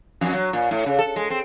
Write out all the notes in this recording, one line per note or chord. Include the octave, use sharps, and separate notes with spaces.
F2
F#3
A#2
A2
C#3
A4
G#3
C4